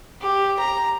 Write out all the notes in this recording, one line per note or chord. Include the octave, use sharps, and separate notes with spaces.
G4
A#5